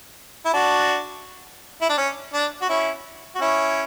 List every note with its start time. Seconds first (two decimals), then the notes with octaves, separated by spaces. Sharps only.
0.45 E4
0.53 D4 F#4
1.81 E4
1.89 D4
1.97 C#4
2.34 D4
2.61 F#4
2.69 C#4 E4
3.35 F#4
3.41 C#4 E4